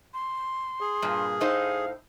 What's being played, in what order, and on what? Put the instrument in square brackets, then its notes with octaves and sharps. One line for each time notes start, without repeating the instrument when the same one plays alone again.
[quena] C6
[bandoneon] G#4
[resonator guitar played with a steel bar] G2 A#2
[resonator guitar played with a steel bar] A2 D#4 C5 [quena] F5